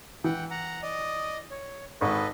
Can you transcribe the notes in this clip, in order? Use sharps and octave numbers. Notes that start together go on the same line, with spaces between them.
E3 F#5 G5
F#5 A#5
D5 D#5 D#6
C#5
G#1 A4 B4 D#5 C#6